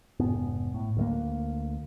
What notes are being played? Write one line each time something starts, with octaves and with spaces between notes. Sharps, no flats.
F1 G#2 B3
A2
D2 A3 A#3